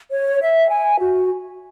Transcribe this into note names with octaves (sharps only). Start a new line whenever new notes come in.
C#5
E5
G#5
F#4